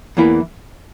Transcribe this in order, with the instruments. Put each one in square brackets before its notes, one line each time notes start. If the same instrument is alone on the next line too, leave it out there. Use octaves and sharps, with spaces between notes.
[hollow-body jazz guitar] E2 E3 A#3 E4